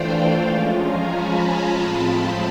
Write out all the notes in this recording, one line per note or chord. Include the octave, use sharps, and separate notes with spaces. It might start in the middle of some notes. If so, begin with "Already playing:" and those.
Already playing: E3 A3 D4 F4 C5 D5 F5 G5
F3 G#3 C#4 F4 G5 A5
G#5 A#5
A5 B5
A2 F3 G#3 C4 F4 A5 B5